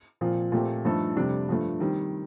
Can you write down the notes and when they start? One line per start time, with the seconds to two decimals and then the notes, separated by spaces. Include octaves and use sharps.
0.21 A#2 F3 C4
0.52 A#2 A3 C4 G4
0.85 G2 F3 A3 D#4 A4
1.16 F2 C3 G3 D4
1.49 G2 F3 A3
1.80 D#3 G3 C4